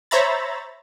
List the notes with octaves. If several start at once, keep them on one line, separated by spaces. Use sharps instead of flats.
C5 C#5 E5 A#5 B5 A6